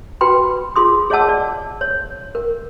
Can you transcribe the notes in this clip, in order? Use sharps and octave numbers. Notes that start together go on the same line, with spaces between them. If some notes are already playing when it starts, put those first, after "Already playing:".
F#4 B4 G5 B5 C6
F4 G#4 C6 D#6
G#4 C#5 D#5 F#5 A5 E6
D5
C#5
A#4